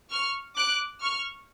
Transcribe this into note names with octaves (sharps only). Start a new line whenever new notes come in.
C#6 F6
D6 F#6
C#6 F6